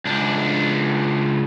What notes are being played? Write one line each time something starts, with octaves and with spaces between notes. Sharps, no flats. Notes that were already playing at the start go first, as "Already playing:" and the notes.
C#2 D4